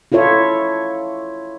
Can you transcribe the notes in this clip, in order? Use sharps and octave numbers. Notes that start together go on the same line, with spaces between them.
E4 F4 A4 C#5 E5